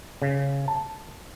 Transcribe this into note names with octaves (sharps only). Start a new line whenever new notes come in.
C#3
A5